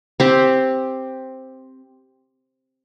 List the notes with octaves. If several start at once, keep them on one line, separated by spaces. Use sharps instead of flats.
C4 G4